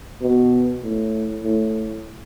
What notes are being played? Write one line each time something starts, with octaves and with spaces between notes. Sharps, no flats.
B2
A2
A2